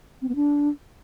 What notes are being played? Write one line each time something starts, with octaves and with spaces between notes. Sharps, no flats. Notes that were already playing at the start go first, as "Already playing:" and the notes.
C4
B3
D4